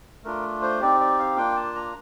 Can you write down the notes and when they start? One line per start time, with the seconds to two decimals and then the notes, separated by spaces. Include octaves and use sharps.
0.24 A3 D4 F4 A#4
0.62 C5
0.80 C4 D#4 G4 D5
1.00 D5
1.19 F5
1.37 A#3 D4 F4 G5
1.56 A5
1.75 A#5